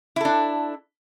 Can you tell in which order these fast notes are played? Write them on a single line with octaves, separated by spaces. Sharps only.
E4 A4 D4